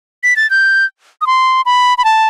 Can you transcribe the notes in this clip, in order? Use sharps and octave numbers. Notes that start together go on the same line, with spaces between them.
B6
A6
G6
D#6
C6
B5
B5
A5